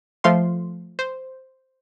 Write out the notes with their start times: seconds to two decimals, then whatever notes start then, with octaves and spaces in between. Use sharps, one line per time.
0.24 F3 A3 F5 C6
0.99 C5